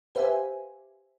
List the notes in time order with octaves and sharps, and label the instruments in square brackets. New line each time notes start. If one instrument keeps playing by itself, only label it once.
[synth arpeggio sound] G4 B4 C5 E5 F5 G#5